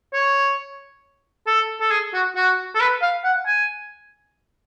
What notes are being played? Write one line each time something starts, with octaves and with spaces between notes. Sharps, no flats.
C#5
A4
A4
G#4
F#4
F#4
A4
B4
F5
F#5
G#5